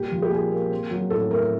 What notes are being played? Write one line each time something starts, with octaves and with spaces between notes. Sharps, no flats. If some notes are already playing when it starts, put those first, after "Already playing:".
Already playing: A#2 G3 G4
F3
G4
A#2 G#4
A#3
C4
F#3
A2 A4
A3 A#4